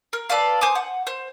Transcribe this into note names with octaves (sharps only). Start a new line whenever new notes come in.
A#4
A4 B4 D5 F5
C5 G#5 D6 D#6
F#5
C5